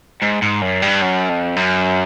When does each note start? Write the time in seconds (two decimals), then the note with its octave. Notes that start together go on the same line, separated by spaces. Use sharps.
0.22 G#2
0.42 G#2
0.62 F#2
0.82 G2
1.02 F#2
1.30 F2
1.56 F#2